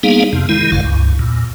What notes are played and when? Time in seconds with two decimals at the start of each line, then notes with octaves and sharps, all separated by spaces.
0.03 G3 A#3 B3 D#4 G#4 F5
0.33 F2 C3
0.49 D#3 G#3 E4
0.72 G1 F#2 C#3 F5
0.84 C#2 G2
1.19 E2 A#2